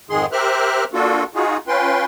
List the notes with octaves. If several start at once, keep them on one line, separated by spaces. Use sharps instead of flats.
F2 G#2 D#3 G#3 G#4 C6
G4 A#4 C5 E5 F6 F#6
A#3 D4 F4 F#4 A4
D#4 F4 F#4 G#4
C#4 F4 B4 G5 C6